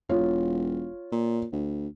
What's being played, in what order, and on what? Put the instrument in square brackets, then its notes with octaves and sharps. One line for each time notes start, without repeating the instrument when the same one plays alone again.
[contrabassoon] E1 [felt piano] F4 C#5
[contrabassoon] A#2
D2